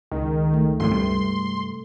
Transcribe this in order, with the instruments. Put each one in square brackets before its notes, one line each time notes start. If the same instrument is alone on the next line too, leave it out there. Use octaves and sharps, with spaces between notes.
[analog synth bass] C#2 [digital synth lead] D#3 [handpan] G#3
[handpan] A3
[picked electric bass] G#1 F2 A2 [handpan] A3 [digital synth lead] C6
[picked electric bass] G2 C3 G3